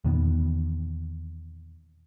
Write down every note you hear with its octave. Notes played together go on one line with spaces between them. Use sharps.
E2 A#2 D#3 B3